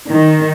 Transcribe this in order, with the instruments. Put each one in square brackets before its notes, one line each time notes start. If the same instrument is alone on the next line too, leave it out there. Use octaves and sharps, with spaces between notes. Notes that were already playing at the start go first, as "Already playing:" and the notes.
[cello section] D#3